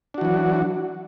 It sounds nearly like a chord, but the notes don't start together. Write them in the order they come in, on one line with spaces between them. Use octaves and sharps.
D4 F#4 E3 F#3